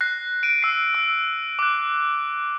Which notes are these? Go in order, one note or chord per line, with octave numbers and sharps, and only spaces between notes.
F#6 A#6 C7
D7 D#7
E6 C7
E6
D6 F#6